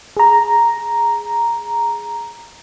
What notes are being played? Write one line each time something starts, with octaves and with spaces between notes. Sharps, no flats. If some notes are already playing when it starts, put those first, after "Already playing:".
G#4 A#5